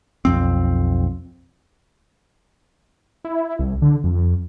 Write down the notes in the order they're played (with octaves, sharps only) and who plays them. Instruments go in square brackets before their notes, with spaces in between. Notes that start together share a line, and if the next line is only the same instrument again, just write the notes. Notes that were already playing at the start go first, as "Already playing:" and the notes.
[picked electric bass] B1 F2 C4
[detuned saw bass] E4
C2
D3
F2